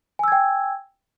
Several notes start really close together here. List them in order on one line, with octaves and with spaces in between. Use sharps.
G#5 E6 G#6 G5